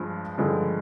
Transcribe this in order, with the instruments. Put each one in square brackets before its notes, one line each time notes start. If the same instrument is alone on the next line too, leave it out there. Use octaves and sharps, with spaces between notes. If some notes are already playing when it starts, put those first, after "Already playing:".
Already playing: [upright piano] G2 F3 G#3
G2 D3 F3 G#3